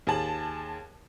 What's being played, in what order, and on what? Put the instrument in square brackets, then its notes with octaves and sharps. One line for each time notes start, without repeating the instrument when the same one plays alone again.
[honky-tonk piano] D#2 G#4 A5 F#7